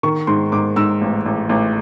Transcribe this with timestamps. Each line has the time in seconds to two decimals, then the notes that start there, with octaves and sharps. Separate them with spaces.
0.03 D#3 C#6
0.27 G#2 C6
0.52 G#2 D6
0.76 G#2 E6
1.01 A1
1.26 A1
1.49 A1